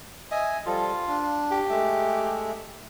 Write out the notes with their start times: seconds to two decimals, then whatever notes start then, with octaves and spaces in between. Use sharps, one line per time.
0.31 D#5 E5 G#5
0.66 F3 G3 F4 A4
1.08 D4
1.51 G4
1.70 G#3 A3 E5